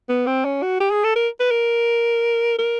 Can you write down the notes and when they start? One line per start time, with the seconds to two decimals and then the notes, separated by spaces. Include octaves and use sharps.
0.09 B3
0.27 C4
0.45 C#4
0.62 F#4
0.80 G4
0.92 G#4
1.04 A4
1.16 A#4
1.40 B4
1.51 A#4
2.58 A#4